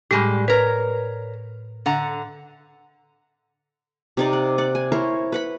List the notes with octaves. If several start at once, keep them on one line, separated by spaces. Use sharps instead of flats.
A2 G3 G#3 G4
A#4 B4 C#5
D3 F#5 A#5
C3 D#4 D5
F#5
D5 F#5
G#5
E4 A#4 C5 C#5
B4 F#5 B5